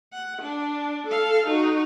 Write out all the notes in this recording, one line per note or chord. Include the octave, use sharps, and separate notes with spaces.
F#5
D4
A4 F5
D#4 F#4